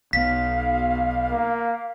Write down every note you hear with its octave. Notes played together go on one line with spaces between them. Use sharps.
B1 B3 F5 B6
A#3